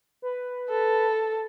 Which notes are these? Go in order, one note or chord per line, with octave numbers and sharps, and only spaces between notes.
B4
A4